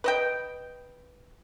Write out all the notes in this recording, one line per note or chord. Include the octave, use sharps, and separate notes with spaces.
B4 D#5 G5